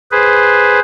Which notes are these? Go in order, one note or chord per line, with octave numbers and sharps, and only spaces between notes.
G#4 B4 C5